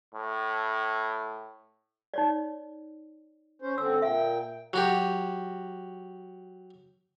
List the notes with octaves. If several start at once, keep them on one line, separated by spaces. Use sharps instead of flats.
A2
D#4 C#5 D5
C#4 C5
D3 C4 E6
A#2 E5 G5
F#3 F#4 G4